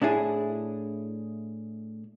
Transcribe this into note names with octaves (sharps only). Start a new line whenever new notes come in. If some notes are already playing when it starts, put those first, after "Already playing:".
A2 D4 E4 G#4